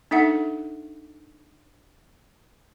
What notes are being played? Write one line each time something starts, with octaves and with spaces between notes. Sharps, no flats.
D4 D#4 A4 E5 F#5